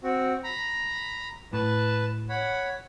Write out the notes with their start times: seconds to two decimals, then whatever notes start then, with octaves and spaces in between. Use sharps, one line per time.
0.03 C4 F#4
0.44 A#5 B5
1.53 A2 B4 A5
2.29 C#5 F#5 B5